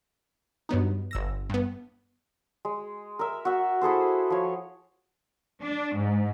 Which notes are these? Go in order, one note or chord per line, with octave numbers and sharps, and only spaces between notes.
G2 F#3 B3 D#4
G1 E6 A#6
G2 B3
G#3
A#4 E5
F#4 E5
E4 G#4 A4 C5
F3 C#5
D4
G#2